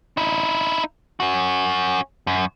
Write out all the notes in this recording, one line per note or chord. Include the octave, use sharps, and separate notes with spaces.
D#4 E4
C#4 F#4
F#2